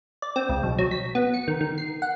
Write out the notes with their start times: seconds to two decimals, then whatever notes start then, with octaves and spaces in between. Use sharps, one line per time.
0.22 D5
0.36 C4
0.49 C#2
0.63 B1
0.79 F#3
0.91 B6
1.15 B3
1.34 C#7
1.48 D#3
1.61 D#3
1.78 C7
2.02 F#5